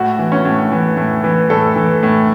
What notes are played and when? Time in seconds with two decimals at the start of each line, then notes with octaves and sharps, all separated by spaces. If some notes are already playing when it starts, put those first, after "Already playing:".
Already playing: A2 F#4
0.19 E3
0.32 C#4
0.45 A2
0.72 E3
0.97 A2
1.24 E3
1.50 A2 A4
1.76 E3
2.03 A2